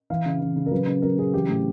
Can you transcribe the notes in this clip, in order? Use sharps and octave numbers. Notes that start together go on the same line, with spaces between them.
E3 F5
C#3
E3
C#3
A#4
F#3 B4
C#3
F#3 A#4
C#3 G#4
E3 G4
A2